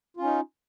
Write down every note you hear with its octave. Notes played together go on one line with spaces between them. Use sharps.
C#4 D#4 F4